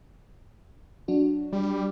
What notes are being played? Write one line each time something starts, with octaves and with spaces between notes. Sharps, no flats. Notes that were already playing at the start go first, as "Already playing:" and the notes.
F#3 D4 F#4
G3